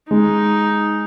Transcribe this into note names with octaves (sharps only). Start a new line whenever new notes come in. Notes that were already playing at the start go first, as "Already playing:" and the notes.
G#3 D#4